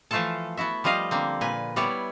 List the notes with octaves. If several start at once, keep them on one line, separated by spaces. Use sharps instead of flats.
E3 F3 A3 F4 A4 A5
B3 E4 F#4 E5
F3 G3 F4 D#5 F5
D3 A#3 C4
A#2 B4 G#5
G3 B3 E4 C#5 D5